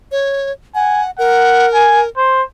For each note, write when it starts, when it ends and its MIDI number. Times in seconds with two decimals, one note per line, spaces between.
0.12 0.52 73
0.75 1.11 78
0.75 1.02 80
1.19 2.09 70
1.19 1.66 78
1.74 2.01 80
2.17 2.42 72